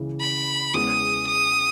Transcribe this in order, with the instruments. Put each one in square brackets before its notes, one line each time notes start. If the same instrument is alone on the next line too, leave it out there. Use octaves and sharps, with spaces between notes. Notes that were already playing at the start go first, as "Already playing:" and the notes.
Already playing: [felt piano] C#2 C#3 E3
[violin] B5
[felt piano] E2 C#3 G#3 [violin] D#6
[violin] D#6